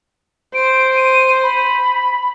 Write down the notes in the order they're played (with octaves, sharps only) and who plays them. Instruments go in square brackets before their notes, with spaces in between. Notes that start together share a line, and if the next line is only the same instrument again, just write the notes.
[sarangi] C5 [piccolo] D7
[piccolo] D#7
B5